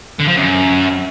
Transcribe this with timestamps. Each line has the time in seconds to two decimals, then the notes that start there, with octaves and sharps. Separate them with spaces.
0.20 D3
0.28 F3
0.37 F#2